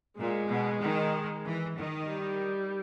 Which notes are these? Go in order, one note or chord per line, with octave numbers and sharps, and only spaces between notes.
A#2 G#3
B2
D#3
E3
D#3
G3